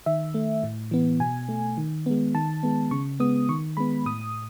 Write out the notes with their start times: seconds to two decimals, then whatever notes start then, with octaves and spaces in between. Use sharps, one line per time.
0.06 D#3 E5
0.34 A3
0.64 A2
0.91 E3 B3
1.20 B2 G#5
1.49 A3
1.77 D#3
2.06 G#3 B3
2.35 D#3 A5
2.63 G#3 B3
2.91 C#3 C#6
3.20 G#3 B3 D#6
3.49 D#3 C#6
3.77 G#3 B3 B5
4.06 A2 D#6